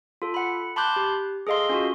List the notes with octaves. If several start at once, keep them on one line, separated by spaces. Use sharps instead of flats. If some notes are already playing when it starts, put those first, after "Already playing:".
F4 A4
F#5 B5
A5 B5 C6 D6 F#6 G6
G4
G#4 A4 D#5 F5 C6
C#4 F4 F#4